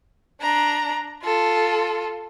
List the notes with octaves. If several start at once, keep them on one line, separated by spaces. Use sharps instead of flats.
D4 A#5
F4 A4